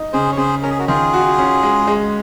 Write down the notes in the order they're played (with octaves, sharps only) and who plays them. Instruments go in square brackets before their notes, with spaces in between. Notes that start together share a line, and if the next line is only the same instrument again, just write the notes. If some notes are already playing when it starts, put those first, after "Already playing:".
Already playing: [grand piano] D#4
[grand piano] C#3 [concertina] G#4 C5
[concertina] C#5
[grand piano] C#3 [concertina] G#4 C5
[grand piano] C#4 [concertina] A#4
[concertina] G#4
F#4 A#4
[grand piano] D#3 [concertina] F4 G#4
[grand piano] F#4
C#4
G#3
G#3